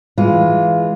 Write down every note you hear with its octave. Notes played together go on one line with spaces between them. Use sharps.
E3 G#3 F4